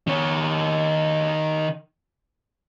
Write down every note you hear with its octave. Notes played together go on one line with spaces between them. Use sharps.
D#3 C#5